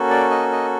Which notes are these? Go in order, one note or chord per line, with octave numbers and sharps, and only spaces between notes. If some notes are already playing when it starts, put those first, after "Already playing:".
Already playing: A#3 C#4 F#4 A4
D5
D#5
D#5